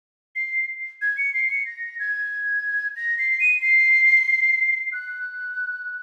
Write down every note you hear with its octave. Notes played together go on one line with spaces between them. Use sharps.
C7
G#6
C#7
C7
C#7
A#6
G#6
A#6
C7
D#7
C7
F#6